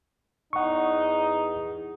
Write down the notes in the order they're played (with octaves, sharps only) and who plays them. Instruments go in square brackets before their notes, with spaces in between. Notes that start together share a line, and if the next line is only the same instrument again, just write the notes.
[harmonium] E2 [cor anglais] D#4 [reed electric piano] F#5 C#6